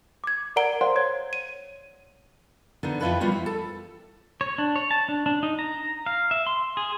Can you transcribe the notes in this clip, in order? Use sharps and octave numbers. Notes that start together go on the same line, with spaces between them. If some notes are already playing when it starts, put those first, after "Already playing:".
D6 G#6
A#4 D5 F#5 A#5 D7 G7
C5 D5 F5 F#5 C6
C#5 G#6
D#7
D3 B3 D#4
F2 G#2 E4 F4 B4 A5
F3 G3 B3 F4 F#4
E4
A4
C#5
D4
C#5
A5
D4
D4
D#4
A#5
F5
E5
C6
G#4